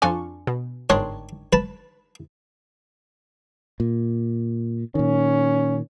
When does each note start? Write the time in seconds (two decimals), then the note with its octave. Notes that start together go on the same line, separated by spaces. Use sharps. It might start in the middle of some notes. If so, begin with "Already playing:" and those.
0.02 F2 D4 F4 A4 G#5 C#6
0.47 B2
0.90 G1 G#2 D#3 D4 C#5 C6
1.53 B4 A5
3.80 A#2
4.95 A#2 D#3 C#4